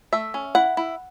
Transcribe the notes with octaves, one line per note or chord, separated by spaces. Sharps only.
A3 E5
C#4
E4 F#5
E4